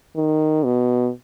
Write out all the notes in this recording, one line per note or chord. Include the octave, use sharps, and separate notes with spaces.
D#3
B2